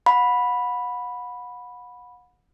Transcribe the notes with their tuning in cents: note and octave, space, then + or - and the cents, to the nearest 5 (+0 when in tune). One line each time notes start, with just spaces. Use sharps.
F#5 -35 B5 -5